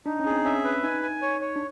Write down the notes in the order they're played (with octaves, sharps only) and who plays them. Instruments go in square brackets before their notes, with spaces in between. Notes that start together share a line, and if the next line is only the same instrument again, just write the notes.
[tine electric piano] D4 [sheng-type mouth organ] D#4
[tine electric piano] C#4
[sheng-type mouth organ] G#4
[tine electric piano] C4
[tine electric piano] C#4 [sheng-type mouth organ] E5
[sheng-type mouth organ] B4
[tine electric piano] D#4 [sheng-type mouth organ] G#5
[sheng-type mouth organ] G#5
C#5
C#5
[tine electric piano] D4